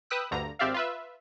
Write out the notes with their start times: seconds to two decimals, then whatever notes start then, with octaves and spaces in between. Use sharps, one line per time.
0.10 B4 G5 D#6 E6 F#6
0.31 D2 G2 D3 A#5
0.59 G#1 C4 G4 D5 E5 F5
0.74 F4 B4 E5